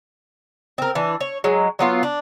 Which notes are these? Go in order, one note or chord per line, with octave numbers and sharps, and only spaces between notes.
C4 A#4
E3 D4
C#5
F#3 G#3
F#3 B3 F4
D4